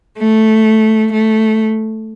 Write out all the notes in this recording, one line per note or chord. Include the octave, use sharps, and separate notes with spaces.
A3
A3